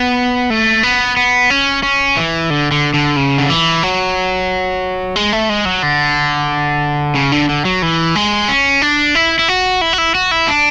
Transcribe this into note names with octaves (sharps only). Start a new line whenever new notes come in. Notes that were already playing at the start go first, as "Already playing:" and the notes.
Already playing: B3
A3
B3
B3
C#4
C#4
E3
D3
D3
D3
C#3
D3
E3
F#3
G#3
A3
G#3
F#3
D3
C#3
D3
D3
F#3
E3
G#3
C#4
D4
E4
E4
F#4
E4
F#4
E4
F#4
E4
D4